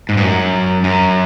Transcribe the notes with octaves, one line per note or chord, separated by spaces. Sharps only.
G#2
G2
F#2
F#2